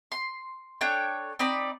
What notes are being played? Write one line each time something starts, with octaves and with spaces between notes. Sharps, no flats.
C6
D4 A4 C#5 G5
C4 D#4 D5 B5